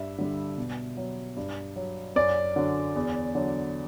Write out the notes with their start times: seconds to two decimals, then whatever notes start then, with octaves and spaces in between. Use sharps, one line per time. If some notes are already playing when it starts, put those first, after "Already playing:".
Already playing: G2 E5
0.18 D3 G3
0.57 B2
0.97 F#3
1.36 G2
1.76 F#3
2.16 F#2 D5
2.56 D3 F#3
2.95 E2
3.35 D3 F#3